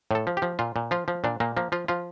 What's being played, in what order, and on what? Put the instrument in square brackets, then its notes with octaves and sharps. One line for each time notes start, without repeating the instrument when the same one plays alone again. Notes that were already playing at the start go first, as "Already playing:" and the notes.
[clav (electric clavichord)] A2 A4
F3
G4
F3
A#2 F4
A#2
F3 F4
F3
A#2 D4
A#2 A#3
F3 A#3
F3 F4
F3 F4